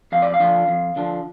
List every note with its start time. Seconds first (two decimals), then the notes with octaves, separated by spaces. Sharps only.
0.12 F2 F5
0.22 D5
0.34 F5
0.40 D3 F3 D4
0.68 F2
0.96 D3 F3 D4